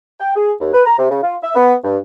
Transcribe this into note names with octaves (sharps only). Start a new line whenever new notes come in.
G5
G#4
D#2
B4
A#5
C3
C#3
F4
E5
B3
G2